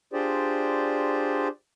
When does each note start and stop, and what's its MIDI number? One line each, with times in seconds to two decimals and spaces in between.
0.13 1.48 62
0.13 1.48 65
0.13 1.48 67
0.13 1.48 68
0.13 1.48 72
0.13 1.48 74